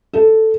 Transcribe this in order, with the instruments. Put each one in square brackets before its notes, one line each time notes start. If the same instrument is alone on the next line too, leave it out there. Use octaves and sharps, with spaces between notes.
[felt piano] A4